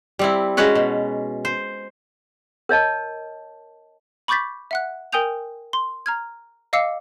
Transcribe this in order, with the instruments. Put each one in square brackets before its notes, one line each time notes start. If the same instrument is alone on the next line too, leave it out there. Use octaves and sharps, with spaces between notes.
[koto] G3 C4 E4
G#3 C#4 F#4 B4 C#5
B2
C5
[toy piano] A#4 C#5 D#5 A5
[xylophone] B5 C#6 D6 G6 A6 B6
E5 F#5 F#6
A#4 G5 G#5 D#6 G6 F7
C6
A#5 F6 G#6
D#5 F5 D6 E6 C7 C#7